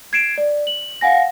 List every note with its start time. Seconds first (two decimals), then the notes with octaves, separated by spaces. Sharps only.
0.13 G#6 C7 D7 E7
0.38 D5
0.67 F#7
1.01 F5 F#5 G#5 A#6